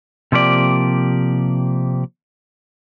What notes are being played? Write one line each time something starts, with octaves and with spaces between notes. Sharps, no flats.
C3 F3 A#3 G4 D5